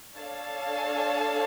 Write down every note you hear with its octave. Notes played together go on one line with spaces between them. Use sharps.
D4 A4 C#5 F5 A5